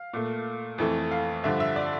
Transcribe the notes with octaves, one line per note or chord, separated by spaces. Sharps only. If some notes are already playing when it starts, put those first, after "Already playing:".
Already playing: F5
A#2 A3
F2 E3 A3
F5
G2 D3 F3 E5
E5
D5